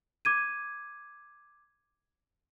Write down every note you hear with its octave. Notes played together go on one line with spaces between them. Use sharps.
D6 G#6 D#7